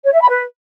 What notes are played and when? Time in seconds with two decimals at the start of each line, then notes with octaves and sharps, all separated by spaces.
0.05 C#5
0.13 E5
0.21 B5
0.29 B4